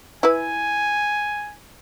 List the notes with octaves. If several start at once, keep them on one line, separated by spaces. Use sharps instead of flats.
E4 B4 G#5